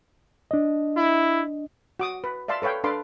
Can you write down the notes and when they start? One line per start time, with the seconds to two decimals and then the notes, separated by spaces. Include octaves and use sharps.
0.51 D4 D#5
0.97 E4
2.00 F#4 D6 D#6
2.24 B4
2.48 D5 E5 F5 A5 C6
2.62 A4 B4 C#5 F5 G5
2.84 D4 A4 B4 F5 C6 D6